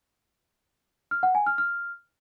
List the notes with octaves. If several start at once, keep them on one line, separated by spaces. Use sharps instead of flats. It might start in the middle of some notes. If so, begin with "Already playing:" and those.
F6
F#5
G#5
F6
F6